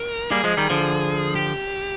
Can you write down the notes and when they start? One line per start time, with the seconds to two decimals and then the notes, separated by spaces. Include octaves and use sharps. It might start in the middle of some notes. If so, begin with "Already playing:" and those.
Already playing: A#4
0.31 G3 A#3 G#4
0.44 F3 G#3
0.57 D#3 G3
0.70 D3 F3
1.35 G4